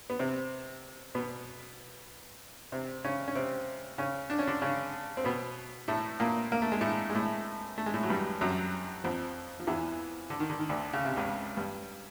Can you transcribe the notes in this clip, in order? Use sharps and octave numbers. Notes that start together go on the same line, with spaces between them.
B3
C3 C4
B2 B3
C3 C4
C#3 C#4
C#4
C3 C4
C#3 C#4
D4
C#4
D3 D4
C#3 C#4
C4
B2 B3
A2 A3
A#2 A#3
A#3
A3
G#3
A2 A3
G#3
A2 A3
A3
G#3
A2 A3
F#3
G2 G3
F#2 F#3
F2 F3
F3
E2 E3
D3
D#3
D3
D#3
D2 D3
C#3
C3
C#2 C#3
G2